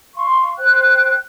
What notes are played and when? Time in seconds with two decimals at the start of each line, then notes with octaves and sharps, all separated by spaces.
0.15 F5 C6 C#6
0.57 C5 G5 F#6